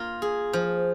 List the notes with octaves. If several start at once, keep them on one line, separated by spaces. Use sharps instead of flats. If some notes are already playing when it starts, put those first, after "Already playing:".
Already playing: A#3 F4
G#4
F3